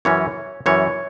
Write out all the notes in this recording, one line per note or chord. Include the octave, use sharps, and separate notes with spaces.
F#2 E3 C#4 C#5
F#2 E3 C#4 C#5